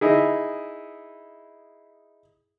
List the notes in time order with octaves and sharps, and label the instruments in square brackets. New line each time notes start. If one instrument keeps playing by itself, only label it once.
[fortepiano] D#4 E4 G#4